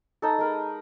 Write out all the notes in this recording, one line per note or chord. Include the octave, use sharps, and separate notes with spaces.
D#4 A4
G#3 A#4 B5